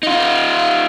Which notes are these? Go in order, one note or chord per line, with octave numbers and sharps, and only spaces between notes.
D#4 F4